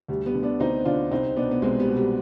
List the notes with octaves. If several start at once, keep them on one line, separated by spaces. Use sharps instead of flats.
D2 G3
G3 B3
D3
B3 D4
D2 C4 D#4
D3 D4 F4
C2 C4 D#4
B2 B3 D4
B3
C2 G#3 C4
G3 B3
B2
G3